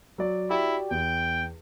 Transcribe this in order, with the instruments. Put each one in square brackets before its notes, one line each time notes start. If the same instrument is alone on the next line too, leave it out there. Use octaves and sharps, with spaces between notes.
[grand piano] F#3 D5
[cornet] E4 [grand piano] F#4 G4 D5
[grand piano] E2 [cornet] G5